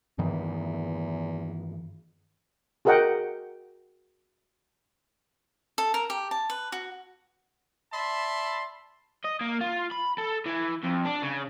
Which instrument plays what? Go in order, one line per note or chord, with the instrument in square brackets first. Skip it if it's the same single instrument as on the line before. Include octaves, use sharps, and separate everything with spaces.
[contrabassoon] E2 [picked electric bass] G2 D#3 E3
[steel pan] F#4 G#4 A#4 D#5 F#5 G5
[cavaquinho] A4
A#4
G4
A5
B4
F#4
[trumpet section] D5 E5 A5 B5 C6
[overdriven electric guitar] D#5
A#3
F4
B5
A4
E3
F2
D4
C#3